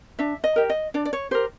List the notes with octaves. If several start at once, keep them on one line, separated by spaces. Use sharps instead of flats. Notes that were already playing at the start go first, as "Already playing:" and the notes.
D4 E5
D#5
G4 A#4
D#5
D4 D5
D5
C#5
G4 A#4 C5